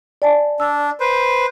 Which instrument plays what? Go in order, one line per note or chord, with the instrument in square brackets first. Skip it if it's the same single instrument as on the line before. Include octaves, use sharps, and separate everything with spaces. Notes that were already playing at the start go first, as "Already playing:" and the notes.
[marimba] D5 G#5 A5
[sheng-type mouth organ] D4 [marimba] E6
[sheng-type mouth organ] B4 C5